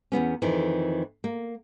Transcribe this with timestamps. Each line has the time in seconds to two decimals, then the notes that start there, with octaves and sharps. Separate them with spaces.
0.12 E2 G2 B3 C#4
0.42 F2 D#3 E3
1.24 A#3